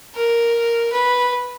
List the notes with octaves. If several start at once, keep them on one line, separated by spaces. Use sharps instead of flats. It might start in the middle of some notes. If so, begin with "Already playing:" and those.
A#4
B4